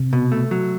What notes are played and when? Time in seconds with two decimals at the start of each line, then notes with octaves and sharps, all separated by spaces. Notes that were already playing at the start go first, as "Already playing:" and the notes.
Already playing: C3
0.13 B2
0.32 A3
0.51 F#3